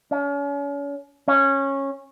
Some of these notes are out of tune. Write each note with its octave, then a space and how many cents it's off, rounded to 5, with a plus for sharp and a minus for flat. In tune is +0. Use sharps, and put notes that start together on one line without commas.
C#4 +40
C#4 -15